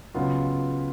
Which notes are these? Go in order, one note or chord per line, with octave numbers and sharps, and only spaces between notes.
C#2 C#3 F#3 B3 F4